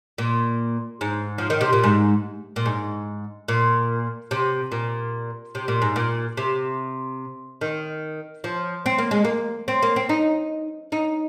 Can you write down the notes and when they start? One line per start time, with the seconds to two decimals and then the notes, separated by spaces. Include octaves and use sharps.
0.18 A#2
1.01 G#2
1.38 F3
1.50 D#3
1.61 C3
1.73 A#2
1.84 G#2
2.56 A#2
2.66 G#2
3.48 A#2
4.31 C3
4.72 A#2
5.55 C3
5.68 A#2
5.82 G#2
5.96 A#2
6.37 C3
7.61 D#3
8.44 F3
8.86 C4
8.98 A#3
9.11 G#3
9.25 A#3
9.68 C4
9.82 A#3
9.96 C4
10.09 D#4
10.92 D#4